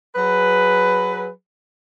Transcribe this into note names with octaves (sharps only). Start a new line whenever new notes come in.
F#3 G#4 B4